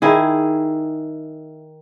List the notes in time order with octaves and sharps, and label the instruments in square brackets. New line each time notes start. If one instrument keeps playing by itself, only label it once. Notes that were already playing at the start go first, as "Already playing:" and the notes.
[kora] D#3 E4 G#4